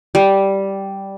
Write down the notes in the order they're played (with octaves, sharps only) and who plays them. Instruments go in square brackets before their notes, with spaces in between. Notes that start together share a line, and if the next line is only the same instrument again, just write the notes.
[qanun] G3